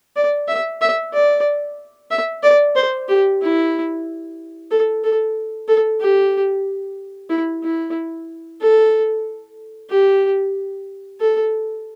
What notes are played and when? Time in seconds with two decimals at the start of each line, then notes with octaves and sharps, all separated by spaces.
0.16 D5
0.48 E5
0.81 E5
1.13 D5
2.10 E5
2.43 D5
2.75 C5
3.08 G4
3.41 E4
4.71 A4
5.04 A4
5.68 A4
6.00 G4
7.30 E4
7.63 E4
8.61 A4
9.89 G4
11.20 A4